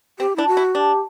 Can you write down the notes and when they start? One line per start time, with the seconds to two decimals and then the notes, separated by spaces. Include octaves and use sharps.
0.19 C4 G4
0.36 D4 E4
0.47 F#4
0.57 E4
0.75 D4 G4